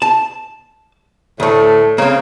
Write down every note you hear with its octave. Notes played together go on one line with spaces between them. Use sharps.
A5
D2 A2 A3
C#3 A#3 C4